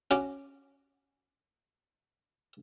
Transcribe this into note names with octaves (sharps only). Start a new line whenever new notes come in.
C#4 F#4 D6